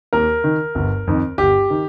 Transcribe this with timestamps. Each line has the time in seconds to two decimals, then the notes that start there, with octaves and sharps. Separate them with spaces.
0.13 D#2 A#4
0.44 D#3
0.75 G1
1.07 F2 D#3
1.38 G1 G4
1.70 D#3